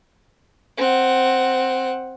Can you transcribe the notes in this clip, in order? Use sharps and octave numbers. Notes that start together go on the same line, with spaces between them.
C4 F#5